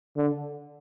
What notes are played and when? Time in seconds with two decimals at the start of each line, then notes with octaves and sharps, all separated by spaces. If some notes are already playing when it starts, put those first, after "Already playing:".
0.16 D3